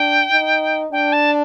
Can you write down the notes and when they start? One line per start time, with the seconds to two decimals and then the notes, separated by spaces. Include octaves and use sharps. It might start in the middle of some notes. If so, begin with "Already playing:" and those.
Already playing: D4 G5
0.32 D#4
0.92 D4 G5
1.12 A5